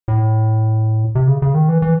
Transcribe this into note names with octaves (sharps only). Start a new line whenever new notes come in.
A2
C3
C#3
C#3
D#3
E3
E3